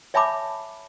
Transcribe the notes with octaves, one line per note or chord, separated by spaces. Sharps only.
C#5 E5 G#5 A5 B5 D6